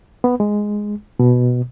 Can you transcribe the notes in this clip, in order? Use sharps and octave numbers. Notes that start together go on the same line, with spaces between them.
B3
G#3
B2